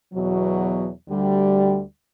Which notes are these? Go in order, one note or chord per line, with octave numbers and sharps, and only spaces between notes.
E2 B2 F#3
D2 D3 G3